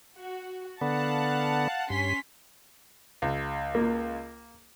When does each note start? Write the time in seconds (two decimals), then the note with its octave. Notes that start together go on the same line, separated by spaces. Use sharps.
0.16 F#4
0.81 D3 B3 F5 F#5 A5
1.90 G2 C#4 C6 B6
3.22 C#2
3.75 A#3